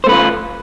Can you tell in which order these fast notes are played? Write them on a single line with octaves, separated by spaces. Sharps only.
C5 A3 B4 F4